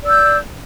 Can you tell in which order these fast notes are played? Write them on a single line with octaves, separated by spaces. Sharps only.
D5 E6 G6